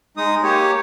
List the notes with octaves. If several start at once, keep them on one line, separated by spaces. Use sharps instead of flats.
G#3 D#4 D#6
A#3 G4 C#5